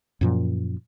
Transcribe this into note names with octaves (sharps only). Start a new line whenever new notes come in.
F#2 A#2 F3